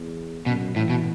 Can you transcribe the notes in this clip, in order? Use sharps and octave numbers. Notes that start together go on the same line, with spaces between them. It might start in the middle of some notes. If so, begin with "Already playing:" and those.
Already playing: E2
F#2 B2
A2 E3
B2